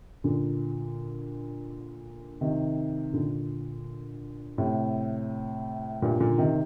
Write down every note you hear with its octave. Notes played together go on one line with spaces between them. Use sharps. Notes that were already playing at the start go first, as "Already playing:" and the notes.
A#2 D3
C3 D#3
A#2 D3
A2 C3
G2 A#2
A#2 D3
C3 D#3